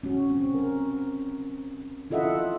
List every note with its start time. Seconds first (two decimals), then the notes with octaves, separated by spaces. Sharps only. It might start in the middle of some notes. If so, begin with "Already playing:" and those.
0.03 C#4 F#4
0.30 C4
0.55 A#4
2.10 E4 F4 A4 D#5 E5 F#5